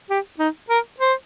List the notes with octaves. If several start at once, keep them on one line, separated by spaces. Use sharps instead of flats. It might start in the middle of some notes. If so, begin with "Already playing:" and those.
G4
D#4
A#4
C5